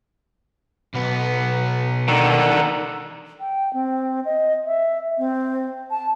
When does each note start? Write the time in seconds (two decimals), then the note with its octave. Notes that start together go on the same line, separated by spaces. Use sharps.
0.95 B1 B3
2.08 D3 D#3
3.40 G5
3.73 C4
4.25 D#5
4.66 E5
5.18 C4
5.91 A5